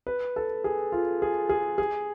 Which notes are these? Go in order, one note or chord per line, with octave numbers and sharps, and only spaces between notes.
B4
A4
G#4
F4
G#4
G#4
G#4